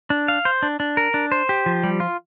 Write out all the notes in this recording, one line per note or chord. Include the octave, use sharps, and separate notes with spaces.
D4
F5
C5
D4
D4
A#4
D4
C5
G4
F3
G3
F4